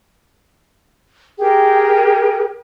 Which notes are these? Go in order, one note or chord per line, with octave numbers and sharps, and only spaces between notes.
G4 G#4 A#4 G5